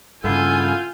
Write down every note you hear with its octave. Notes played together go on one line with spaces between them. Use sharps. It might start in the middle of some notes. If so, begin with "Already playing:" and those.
G2 C#3 B3 E4 F4 A4 G#5 G6